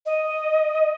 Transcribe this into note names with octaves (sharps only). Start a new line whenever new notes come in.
D#5